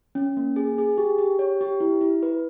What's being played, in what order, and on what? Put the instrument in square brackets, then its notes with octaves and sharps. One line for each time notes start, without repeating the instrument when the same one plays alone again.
[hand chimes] C#4
A#3
G#4
G#4
G4
G4
C#5
G4
E4
E4
B4